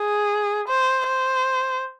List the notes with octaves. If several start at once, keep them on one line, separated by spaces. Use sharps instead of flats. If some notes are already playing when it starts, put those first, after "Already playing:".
Already playing: G#4
C5
C5